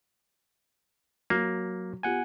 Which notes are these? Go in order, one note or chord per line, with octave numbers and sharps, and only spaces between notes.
F#3 A#3
B3 F4 G4 F#5 G#5